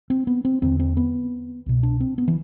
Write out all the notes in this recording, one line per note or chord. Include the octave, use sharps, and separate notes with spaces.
C4
B3
C4
E2 D3 C4
C4
B3
C2 B2
D4
C4
B3
E3